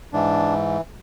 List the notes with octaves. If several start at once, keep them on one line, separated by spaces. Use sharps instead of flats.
G#2 E3 D4